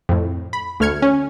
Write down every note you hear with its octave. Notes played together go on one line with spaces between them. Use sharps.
F2 A2
B5
D2 A3 F6 G#6 C#7
C#4